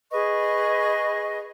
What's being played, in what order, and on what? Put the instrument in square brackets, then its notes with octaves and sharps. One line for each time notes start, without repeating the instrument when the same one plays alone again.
[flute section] G#4 B4 D#5 C#6